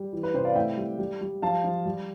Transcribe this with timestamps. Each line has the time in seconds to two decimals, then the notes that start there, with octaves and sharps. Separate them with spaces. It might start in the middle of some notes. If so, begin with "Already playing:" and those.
Already playing: G3
0.13 E3
0.23 B4
0.34 C3 C5
0.45 D5 F5
0.55 A2 E5 G5
0.77 G3
0.99 G3
1.21 G3
1.42 F3 F5 A5
1.64 F3
1.85 G3